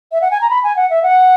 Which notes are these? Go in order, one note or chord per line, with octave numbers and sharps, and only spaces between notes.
E5
F#5
G#5
A#5
B5
G#5
F#5
E5
F#5